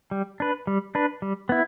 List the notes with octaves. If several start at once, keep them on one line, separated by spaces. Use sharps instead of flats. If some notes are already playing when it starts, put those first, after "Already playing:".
G3
D4 B4
G3
D4 B4
G3
B3 E4